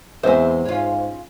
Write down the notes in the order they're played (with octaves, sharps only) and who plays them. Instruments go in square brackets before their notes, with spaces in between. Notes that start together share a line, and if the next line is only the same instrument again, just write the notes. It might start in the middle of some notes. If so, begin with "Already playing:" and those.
[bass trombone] E2 [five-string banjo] G#3 C4 C5 [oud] B4 E5
[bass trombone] G#2 [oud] C#4 F4